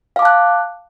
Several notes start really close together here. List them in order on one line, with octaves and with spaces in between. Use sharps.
F5 D6 A5 F#6